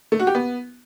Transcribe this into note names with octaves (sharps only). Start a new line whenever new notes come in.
A3
F#4
G4
B3